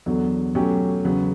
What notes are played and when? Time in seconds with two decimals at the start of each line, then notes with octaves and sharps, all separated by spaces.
0.06 E2 D3 F#3
0.55 B2 F#3 A3 C#4 G4
1.04 E2 C#3 F#3 B3